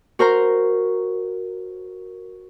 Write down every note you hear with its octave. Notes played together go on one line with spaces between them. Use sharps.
F#4 A#4 C5 A#5